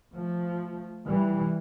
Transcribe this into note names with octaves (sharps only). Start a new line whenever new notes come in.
F3 A3
E3 G3